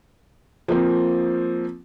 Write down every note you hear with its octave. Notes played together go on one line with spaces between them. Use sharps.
F3 A#3 C4